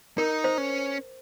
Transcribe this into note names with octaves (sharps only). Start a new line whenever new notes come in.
D#4 A#4
C5
C#4